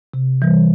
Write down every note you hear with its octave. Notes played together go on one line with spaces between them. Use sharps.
C3
E3 G3